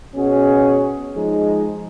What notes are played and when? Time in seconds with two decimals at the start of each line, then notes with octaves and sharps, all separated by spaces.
0.15 B2 C#4 F#4 G#4
1.15 F3 G#3 D#4